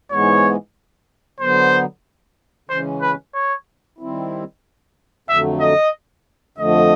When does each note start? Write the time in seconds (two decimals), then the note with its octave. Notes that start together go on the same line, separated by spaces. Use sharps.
0.11 G#2 E3 G#3 B3 C#5
1.40 D3 F#3 B3 C5
2.69 C#3 E3 G#3 C#4 C5
3.02 B4
3.34 C#5
3.99 D#3 G3 C4 E4
5.28 F2 D3 F#3 A3 E5
5.60 D#5
6.58 F2 D3 F3 A3 D#5